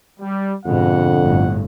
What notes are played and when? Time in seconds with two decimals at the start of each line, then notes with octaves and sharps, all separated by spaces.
0.20 G3
0.66 F2 G#2 B2 D3 F#5
1.22 G1 A2